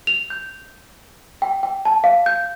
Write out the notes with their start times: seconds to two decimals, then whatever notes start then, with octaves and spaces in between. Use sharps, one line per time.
0.07 F7
0.30 G6
1.42 G5
1.63 G5
1.85 A5
2.04 F5
2.26 G6